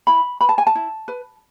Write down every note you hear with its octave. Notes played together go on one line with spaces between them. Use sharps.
E4 B5
B4 B5
A5
G#5
A5
E4
B4